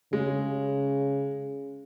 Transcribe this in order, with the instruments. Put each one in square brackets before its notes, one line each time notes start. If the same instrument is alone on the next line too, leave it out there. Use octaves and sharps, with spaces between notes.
[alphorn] C#3 [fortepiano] G#3